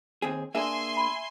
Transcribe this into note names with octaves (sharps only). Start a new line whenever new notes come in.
D#2 C4 G#4
A#3 D4 G#4 E5 G#5 C6
B5